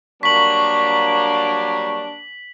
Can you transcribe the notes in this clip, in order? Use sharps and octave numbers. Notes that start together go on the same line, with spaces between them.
F#3 G3 A#3 D4 C#6 B6 F#7